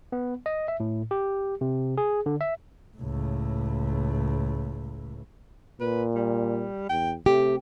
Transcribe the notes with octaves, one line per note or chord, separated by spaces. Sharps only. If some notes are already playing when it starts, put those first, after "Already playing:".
B3
D#5
E5
A2
G4
C3
G#4
D3
E5
C#2 A2
A#2 B4
G3
E2 G5
C3 A3 G4